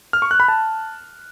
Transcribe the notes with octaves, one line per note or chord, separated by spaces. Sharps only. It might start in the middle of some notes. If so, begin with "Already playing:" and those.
F6
C#6
F#6
B5
A5